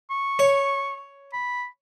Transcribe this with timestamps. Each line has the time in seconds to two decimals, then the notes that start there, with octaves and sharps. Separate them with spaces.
0.10 C#6
0.39 C#5
1.33 B5